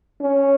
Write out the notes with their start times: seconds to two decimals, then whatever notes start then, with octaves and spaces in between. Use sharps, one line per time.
0.22 C#4